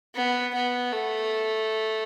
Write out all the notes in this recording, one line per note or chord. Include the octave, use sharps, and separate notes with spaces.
B3
B3
A3